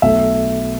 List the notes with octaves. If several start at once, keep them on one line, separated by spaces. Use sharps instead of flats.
B1 B2 A3 E5